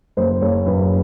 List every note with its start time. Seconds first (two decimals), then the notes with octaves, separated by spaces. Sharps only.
0.17 F#1 C5
0.41 F#1 C#5
0.66 F#2 B4